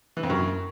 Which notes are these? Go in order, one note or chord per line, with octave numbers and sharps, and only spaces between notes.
E3
F2
F#2